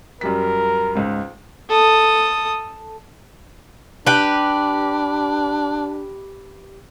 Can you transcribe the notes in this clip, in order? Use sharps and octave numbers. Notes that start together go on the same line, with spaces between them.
F#2 G3 A#4 B6
C#2 G#2
A4 D#6
D4 G4 B4